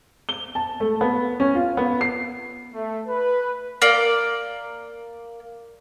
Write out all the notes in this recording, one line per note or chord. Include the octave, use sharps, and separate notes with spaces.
G7
A5
A3
B3
C#4
F4
B3
C7
A3
B4
A#3 D5